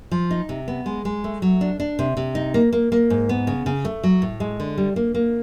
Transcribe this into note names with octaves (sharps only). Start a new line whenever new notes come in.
F3
D#4
C3
B3
G#3
G#3
A3
F#3
D4
D4
C3
C3
D#4
A#3
A#3
A#3
G#2
B3
C#3
C#3
A3
F#3
A2
G#3
D3
G3
A#3
A#3